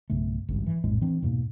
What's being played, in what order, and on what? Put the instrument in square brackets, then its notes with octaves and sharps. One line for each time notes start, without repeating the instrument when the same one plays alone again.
[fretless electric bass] B1 G2 C#3 A3
G#1 C#2 G2
E3
A#1 F2 A2 G#3
E3 C4 D4
E2 G#2 B2 A#3